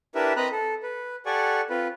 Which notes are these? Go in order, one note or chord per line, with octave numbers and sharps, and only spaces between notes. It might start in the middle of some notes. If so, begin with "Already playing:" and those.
D4 E4 G4 A#4 B4 E5
C4 B4 D#5 A#5 B5 F#6
A4
B4
G4 A4 D5 F#5 G#5 C#6
C4 F4 B4